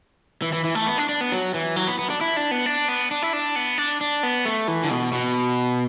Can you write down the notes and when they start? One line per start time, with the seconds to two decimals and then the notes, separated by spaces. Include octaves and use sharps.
0.42 E3
0.53 E3
0.64 E3
0.75 A3
0.87 B3
0.98 D4
1.09 D4
1.21 B3
1.32 F#3
1.54 E3
1.76 F#3
1.87 B3
1.99 B3
2.10 D4
2.21 E4
2.37 D4
2.51 B3
2.66 D4
2.88 B3
3.11 D4
3.22 E4
3.33 D4
3.56 B3
3.78 D4
4.01 D4
4.23 B3
4.45 A3
4.68 E3
4.83 D3
4.90 B2
5.13 B2